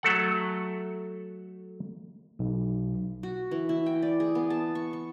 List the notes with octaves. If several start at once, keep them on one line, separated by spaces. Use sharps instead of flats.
F#3 A3 A4 F#5
B1
F#4
E3
E4
G5
D5
G#4
B3
A5
C#6
C#6